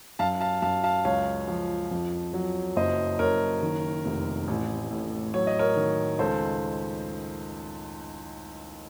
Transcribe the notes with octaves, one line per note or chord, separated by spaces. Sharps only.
F#2 F5 A5
F5 A5
F#2 F5 A5
F5 A5
C#2 C#5 F5
F3
F2
F#3
F#1 C5 D#5
F#1 A#4 C#5
D#3
F1
A1
A2
F#3 C#5
D#5
A#4 C#5
D#3
C#2 A4 C5